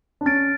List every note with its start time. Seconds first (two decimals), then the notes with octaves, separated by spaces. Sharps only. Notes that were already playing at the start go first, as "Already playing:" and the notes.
0.21 D4
0.26 C#4 F6 A6 D7